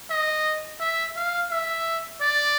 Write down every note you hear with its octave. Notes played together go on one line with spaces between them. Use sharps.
D#5
E5
F5
E5
D5